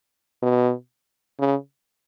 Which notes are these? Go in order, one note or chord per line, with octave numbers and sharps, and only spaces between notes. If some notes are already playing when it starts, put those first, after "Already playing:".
B2
C#3